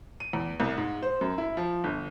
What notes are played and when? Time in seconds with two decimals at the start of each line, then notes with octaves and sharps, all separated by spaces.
0.20 D#7
0.33 E2
0.60 C2
0.77 G#2
1.03 C5
1.21 F#2
1.38 E4
1.57 F3
1.84 G1